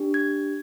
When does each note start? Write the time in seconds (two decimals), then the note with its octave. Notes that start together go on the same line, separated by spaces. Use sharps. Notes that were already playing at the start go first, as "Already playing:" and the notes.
Already playing: D4 G4
0.14 G#6